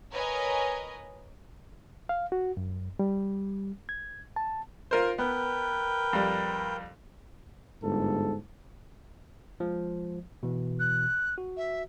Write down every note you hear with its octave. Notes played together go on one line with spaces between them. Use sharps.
A#4 B4 C#5 D#5 G#5 A#5
F5
F#4
F#2
G3
G#6
A5
F4 A#4 C5
B3 A#4 B4 G5
F2 G3
G1 G#2 A4
F3 G#3
B2 E3
F#6
F#4
E5